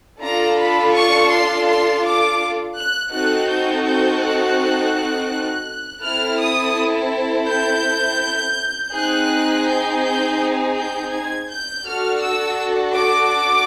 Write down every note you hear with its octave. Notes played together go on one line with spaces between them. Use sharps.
D4 F4 A4 A#5
B5
C#6
C6
C6
D6
F#6
C4 D#4 F#4 A4 F#6
G6
G6
F#6
C4 E4 A4 F6
D#6
G6
C4 D#4 G#4 F#6
G6
G6
G6
G#6
G6
D4 F#4 A4 F6
E6
D6